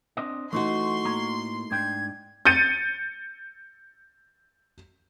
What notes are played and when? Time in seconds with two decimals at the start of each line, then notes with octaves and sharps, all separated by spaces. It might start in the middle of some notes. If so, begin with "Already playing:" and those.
0.17 C4 D4 D#5
0.53 E3 A3 D#4 F#4 C6 C#6
1.05 A2 A#3 A#5
1.71 G#2 D4 G5 G#6
2.45 G6 A6 C#7 D#7